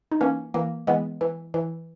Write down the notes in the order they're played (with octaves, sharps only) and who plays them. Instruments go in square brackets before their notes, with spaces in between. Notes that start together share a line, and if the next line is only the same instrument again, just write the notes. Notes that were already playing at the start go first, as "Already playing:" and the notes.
[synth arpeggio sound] D#4
E3 A#3 C#4
E3 A#3
E3 G#3 B3
E3
E3